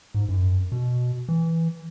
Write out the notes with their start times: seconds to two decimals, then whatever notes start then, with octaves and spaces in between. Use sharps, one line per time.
0.15 G#2
0.29 F#2
0.72 B2
1.29 E3